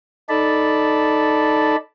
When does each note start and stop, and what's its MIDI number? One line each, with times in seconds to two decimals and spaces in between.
0.29 1.76 63
0.29 1.76 69
0.29 1.76 74
0.29 1.76 81
0.29 1.76 83